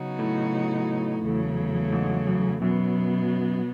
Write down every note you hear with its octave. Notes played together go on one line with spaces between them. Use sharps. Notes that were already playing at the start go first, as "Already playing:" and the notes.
Already playing: C#3 F#3 B3 D#4 F#4
A2
E2 C#3 F#3 A3
G#2
F#2
F#2 B2 F#3 B3